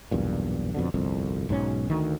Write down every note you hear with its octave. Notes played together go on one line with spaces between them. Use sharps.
B1 E2 G2 A#2
F2 B2 D3
G1 C2 F2
B1 G#2 B2 C#4
D2 D#3